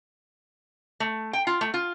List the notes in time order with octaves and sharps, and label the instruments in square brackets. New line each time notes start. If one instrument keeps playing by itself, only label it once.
[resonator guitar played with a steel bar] A3
G5
F4
A3
F4